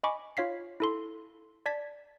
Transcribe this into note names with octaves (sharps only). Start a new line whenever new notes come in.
D#5 G#5 B5 C#6 D6
F4 C#5 F5 B6 C7
E4 A4 C6
D5 A5 G#6 B6